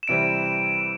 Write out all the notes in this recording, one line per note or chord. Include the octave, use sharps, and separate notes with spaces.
E7
C3 E3 G3 C4 E4 D7